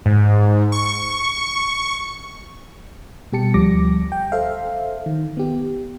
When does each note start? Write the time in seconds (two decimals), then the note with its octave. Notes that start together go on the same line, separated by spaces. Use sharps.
0.06 G#2
0.72 C#6
3.32 B2 G3 G4 A5 C#7
3.54 D2 F3 G3 D6 A#6
4.12 G5
4.32 A4 C5 E5 F5
5.06 D#3
5.37 B3 G4